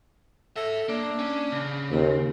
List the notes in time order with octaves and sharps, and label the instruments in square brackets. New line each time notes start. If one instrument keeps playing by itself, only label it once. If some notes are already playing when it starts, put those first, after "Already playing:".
[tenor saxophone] A4 [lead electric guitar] C#5 E5
[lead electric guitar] A#3 [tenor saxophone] D4
[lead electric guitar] C#4
C#3
[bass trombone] D#2 [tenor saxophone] C4